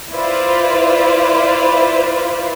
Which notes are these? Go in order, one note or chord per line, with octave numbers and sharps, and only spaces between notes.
E4 F4 B4 C5 D5